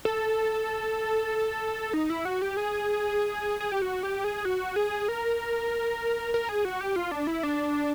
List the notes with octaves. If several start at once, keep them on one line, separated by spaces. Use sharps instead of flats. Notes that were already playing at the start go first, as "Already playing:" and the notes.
A4
D#4
E4
F#4
G4
G#4
G#4
G4
F#4
G4
G#4
F#4
G#4
A#4
A#4
G#4
F#4
G4
F4
D4
E4
D4